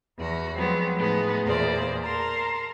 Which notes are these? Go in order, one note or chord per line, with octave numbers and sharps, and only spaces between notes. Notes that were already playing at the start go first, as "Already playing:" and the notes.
E2 F#4
F3 F#3 G#3 B3 C4
A2 G#3 B3 D#4
E2 A#2 A#3 G#4 C5 D5
A#4 A5 A#5 C6